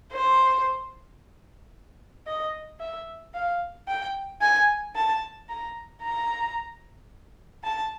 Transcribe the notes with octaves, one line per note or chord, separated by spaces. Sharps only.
C5
D#5
E5
F5
G5
G#5
A5
A#5
A#5
A5